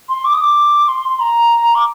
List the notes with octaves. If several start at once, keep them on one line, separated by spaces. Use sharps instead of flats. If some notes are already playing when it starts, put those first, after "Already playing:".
C6
D6
D#6
D6
C6
C6
A#5
D6